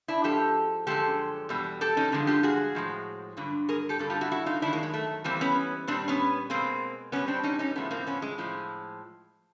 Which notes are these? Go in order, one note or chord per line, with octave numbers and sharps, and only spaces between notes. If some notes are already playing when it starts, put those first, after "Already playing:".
D4 E4
G#2 F3 G4 A4
F#2 D3 F3 G#3 G4 A4
E2 B2 G3
G4 A4
C#4 D#4
G2 D3 F3 G#3
F4 G4
F#4 G#4
A2 F3 G#3
G2 D3 F#3
G#4 A#4
G4 A4
G2 D3 G3 A4
F4 G4
E4 F#4
E4 F#4
D#4 F4
F#2 D#3 F#3 D4 E4
G#3 A#3
G#3
A3
G#2 E3 G3 A#3 C4
B3 C#4
A#2 G3 C4 D4
B3 C#4
B2 G#3 A#3 C4
B2 G3 B3 C#4
C4 D4
C#4 D#4
C#4 D#4
A2 F3 G#3 A3 B3
A#3 C4
B3 C#4
G#3
A2 F3 G#3